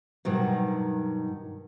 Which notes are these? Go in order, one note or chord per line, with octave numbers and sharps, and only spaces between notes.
G2 B2 D#3 F#3